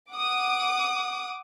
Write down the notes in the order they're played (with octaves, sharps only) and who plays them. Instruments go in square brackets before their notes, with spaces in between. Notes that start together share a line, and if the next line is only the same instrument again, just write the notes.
[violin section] F#5 D6 D#6